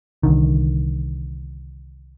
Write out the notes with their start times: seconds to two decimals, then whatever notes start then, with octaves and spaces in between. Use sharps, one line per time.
0.23 C2 D3 D#3